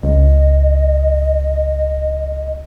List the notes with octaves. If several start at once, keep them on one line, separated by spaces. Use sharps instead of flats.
C#2 D#5